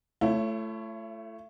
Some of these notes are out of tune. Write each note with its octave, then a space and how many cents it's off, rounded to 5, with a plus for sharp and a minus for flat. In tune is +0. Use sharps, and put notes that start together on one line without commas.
A3 +0 E4 +40 C#5 +0